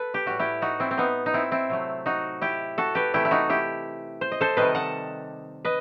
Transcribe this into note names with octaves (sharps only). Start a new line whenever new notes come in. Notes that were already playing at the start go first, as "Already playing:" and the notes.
Already playing: A4 B4
G4
A2 G3 F#4
E4 G4
D#4 F#4
C4 E4
C4
B3 D#4
D#4
C4 E4
C4 E4
C3 F#3 A3
D#4 F#4
E4 G4
F#4 A4
G4 B4
C3 E3 A3 E4 G4
E4
D#4 F#4
E4 G4
C5
D#5
A4 C5
C3 D#3 G3 B4 D#5
F#5 A5
B4 D#5